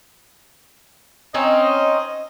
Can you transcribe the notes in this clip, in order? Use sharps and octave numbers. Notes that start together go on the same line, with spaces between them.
C4 C#4 D#4 D#5